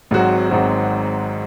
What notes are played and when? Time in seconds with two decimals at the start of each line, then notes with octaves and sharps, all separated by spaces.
0.11 G#1 G#2 F#3 C4 F#4
0.50 G#1 G#2 F#3 C4 F#4